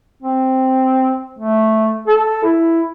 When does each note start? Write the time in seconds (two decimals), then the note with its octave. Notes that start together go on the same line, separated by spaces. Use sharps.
0.23 C4
1.39 A3
2.08 A4
2.44 E4